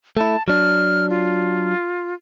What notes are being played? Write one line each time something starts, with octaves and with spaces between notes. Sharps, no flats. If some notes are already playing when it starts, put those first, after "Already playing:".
A3 E4 A5
F#3 D4 F6
F4